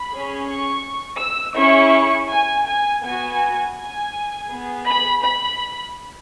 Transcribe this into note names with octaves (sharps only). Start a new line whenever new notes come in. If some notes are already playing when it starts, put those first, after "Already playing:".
Already playing: B5
C#4 G#4
C#6
E6
C#4 E4 G#4 C#6
G#5
G#5
B3 F#4 G#5
G#5
B3 G#4
B5
B5